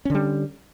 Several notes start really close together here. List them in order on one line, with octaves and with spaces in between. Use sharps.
C#4 D3 G3